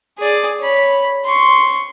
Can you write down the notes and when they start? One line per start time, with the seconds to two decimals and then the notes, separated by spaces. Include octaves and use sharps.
0.19 G#4 D5
0.60 C#5 B5
1.25 C6 C#6